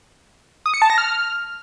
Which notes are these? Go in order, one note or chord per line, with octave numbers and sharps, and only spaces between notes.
D#6
C#7
A5
A#6
F6